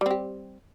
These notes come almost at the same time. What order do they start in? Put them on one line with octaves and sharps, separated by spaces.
G3 C4 G4